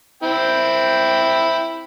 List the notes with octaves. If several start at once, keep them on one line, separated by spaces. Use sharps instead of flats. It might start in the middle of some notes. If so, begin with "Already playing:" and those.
C4 E4 G5